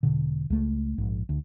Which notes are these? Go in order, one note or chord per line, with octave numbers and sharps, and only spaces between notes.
E1 B2 D3
C#2 A3
A#1 G#2
D2